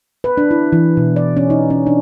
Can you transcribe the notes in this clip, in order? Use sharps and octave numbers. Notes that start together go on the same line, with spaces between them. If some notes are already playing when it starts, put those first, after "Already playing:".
B4
D4
E4
E3
B2
D5
C#4
D#4
C#4
D4